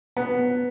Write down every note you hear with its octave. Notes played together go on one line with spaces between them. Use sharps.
B3